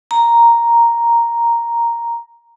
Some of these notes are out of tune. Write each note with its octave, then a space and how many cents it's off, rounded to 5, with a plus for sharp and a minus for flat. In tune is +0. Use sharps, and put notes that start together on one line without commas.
A#5 +0